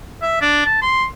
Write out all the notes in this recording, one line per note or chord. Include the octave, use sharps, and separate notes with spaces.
E5
D4
A5
C6